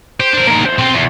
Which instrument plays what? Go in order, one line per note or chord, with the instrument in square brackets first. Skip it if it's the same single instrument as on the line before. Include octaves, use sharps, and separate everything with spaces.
[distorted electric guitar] G4 [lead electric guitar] C5
[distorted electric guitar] D4 A#4
[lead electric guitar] A#3 D#4
E2 C5
[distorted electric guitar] B1 F4 [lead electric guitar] C4 G5
[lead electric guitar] E2